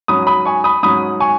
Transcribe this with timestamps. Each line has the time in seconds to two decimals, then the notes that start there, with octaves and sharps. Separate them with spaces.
0.08 G#2 F#3 C#4 B5 D#6
0.27 B5 D#6
0.45 G#5 C#6
0.64 B5 D#6
0.83 G#2 F#3 C#4 B5 D#6
1.20 G#5 C#6